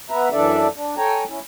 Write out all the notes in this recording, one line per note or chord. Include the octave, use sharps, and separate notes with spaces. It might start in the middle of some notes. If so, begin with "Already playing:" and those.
B3 B4 E5 A#5
F#2 E3 D4 A4 D5 E5
D4
A4 C#5 G5 G#5 A#5
C#4 E4